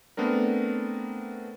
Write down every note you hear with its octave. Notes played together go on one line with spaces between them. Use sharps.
A3 B3 C4 D4 A#4